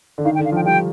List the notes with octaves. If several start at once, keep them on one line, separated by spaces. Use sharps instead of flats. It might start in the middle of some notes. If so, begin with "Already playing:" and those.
D3
D#3 F5
G5
D3
F5
F3 G5
G3 G5